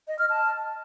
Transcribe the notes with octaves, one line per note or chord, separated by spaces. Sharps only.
D#5
F6
A5